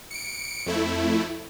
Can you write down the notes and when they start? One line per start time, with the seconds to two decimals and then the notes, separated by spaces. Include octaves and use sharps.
0.11 C#7 D7
0.66 F2 A3 E4